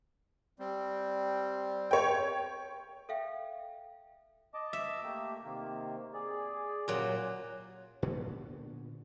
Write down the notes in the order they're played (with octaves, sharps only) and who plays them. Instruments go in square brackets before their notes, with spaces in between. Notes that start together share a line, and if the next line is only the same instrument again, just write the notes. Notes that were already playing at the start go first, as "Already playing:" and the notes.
[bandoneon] G3 C4
[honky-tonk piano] C#5 G5
[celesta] A4 E5 F5 G5
[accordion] D#5 A5 D6
[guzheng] E5
[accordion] A3 A#3 G4
C3 D#3 A#3
G#4 D5
[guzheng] A#2 F#3 [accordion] C#3 G4
[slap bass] A#2 D3 B3 C#4